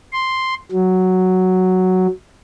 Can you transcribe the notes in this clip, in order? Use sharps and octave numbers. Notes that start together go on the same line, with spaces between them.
C6
F#3